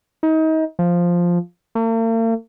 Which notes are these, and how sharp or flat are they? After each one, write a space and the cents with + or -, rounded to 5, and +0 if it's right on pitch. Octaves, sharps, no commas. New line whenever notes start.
D#4 +30
F3 +0
A#3 -45